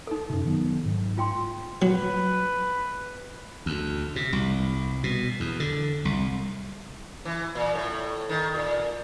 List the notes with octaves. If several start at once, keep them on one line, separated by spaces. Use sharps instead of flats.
D#4 A4
F#2 C3
D#3 F#3 B3
G#2
F4 G5 C6
F#3 B4
D2
C3
C2
B2
E2
D3
C2
E3
A#2
A2
D#3
A#2